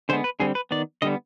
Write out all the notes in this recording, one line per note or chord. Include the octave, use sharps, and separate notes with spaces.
D3 G#3 B3 C5
B4
D3 G3 C4 G#4
B4
D#3 B3 D5
D3 G3 B3 D#5